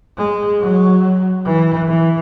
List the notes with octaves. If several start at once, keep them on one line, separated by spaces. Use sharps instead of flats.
G#3
F#3
E3
E3